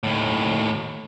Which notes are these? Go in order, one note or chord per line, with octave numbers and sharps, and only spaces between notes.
D#2 A2